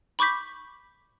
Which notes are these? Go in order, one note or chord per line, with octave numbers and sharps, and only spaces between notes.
B5 C#6 D6 G6 B6